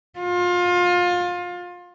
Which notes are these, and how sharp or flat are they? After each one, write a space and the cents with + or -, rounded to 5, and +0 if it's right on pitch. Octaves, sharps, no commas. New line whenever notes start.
F4 +25